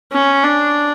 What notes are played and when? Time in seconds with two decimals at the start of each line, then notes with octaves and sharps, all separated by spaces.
0.12 C#4
0.44 D4